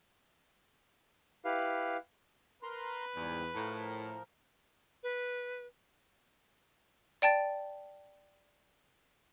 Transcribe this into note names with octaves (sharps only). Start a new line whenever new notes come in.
E4 G4 B4 F5
A#4 B4 A#5 C6
E2 G#2 G3
A2 F3 A#4
B4
D5 G5 A5 A6